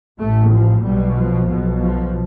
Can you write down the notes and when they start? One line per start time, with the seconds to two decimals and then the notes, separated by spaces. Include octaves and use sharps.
0.18 A1 A2 A3
0.51 F3
0.83 B1 B2 G3
1.15 F3
1.48 B1 B2
1.80 F3